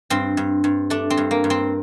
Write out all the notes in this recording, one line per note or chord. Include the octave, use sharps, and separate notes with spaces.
G2 C4
G2
G2
A3 D4
C4
G2
A#3
G2
C4